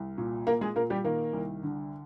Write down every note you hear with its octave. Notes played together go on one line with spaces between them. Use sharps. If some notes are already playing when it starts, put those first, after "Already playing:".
Already playing: C2
A#2
A#2 A#3 A#4
G#3 G#4
A#2 A#3 A#4
G3 G4
D#3 A#3 A#4
C2
D3